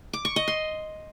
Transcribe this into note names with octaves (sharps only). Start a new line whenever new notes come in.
D6
C#6
D#5
C6